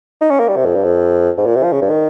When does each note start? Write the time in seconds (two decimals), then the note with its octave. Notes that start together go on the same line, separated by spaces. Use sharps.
0.21 D#4
0.30 C#4
0.39 A#3
0.48 G3
0.56 C3
0.65 F2
0.75 G2
0.84 F2
1.38 G#2
1.46 A#2
1.55 C3
1.63 F3
1.72 C#3
1.82 G2
1.90 D#3